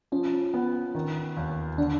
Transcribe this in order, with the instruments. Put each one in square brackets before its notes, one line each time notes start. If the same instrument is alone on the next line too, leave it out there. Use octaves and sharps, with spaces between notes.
[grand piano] F3 [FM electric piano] C#4
[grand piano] B3
D#3
D#2
[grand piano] D3 [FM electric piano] D4